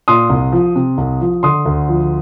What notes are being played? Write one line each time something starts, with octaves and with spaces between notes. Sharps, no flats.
A#2 C6 D#6
C2
F3
C3
C2
F3
D3 C6 D#6
D2
F3